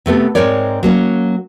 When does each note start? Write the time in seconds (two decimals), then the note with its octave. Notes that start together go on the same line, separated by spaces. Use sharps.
0.06 C3 A3 B3 A4
0.35 G#2 G#3 C4 A#4 C#5 D5
0.83 F#3 A#3 C#4